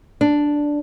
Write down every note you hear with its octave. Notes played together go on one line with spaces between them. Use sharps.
D4